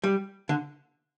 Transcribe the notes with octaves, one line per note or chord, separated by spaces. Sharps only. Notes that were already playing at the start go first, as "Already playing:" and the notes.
G3
D3